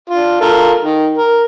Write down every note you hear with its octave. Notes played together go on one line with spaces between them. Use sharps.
D4 F4
F4 A4 A#4
D#3
A#4